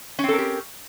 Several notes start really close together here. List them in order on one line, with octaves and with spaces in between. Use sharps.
C#4 C4 A4 A#4 G4